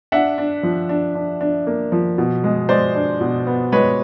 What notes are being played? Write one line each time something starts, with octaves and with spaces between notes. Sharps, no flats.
D4 E5 F#5
D4
F3
D4
D4
D4
A#3
F3
B2
G#3
G#3 C5 D5
D4
B2
B3
G#3 B4 C#5